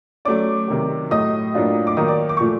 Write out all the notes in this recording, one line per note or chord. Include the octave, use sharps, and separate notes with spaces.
F#3 A3 C#4 D5 D6
C3 D#3 F#3
A2 F#3 A3 D#5 D#6
A2 F#3 A#3 D4 F4
D6
D#3 F#3 A#3 D#4 D#5 D#6
D5 D6
D6
C#6
A#2 F3 A3